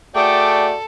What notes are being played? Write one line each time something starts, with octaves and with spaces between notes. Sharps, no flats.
A3 F#4 G#4 A4 D5 G5 D6